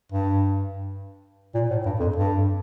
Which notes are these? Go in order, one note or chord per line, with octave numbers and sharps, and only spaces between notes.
G2
A#2
A2
G2
F2
G2